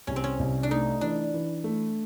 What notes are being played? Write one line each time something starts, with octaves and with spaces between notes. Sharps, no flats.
C2 C#4
C4
C#4
C2
D4
A3 D#4
E3 D4
E3
A3